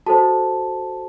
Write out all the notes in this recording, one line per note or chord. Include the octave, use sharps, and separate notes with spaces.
F#4 A4 C5 A5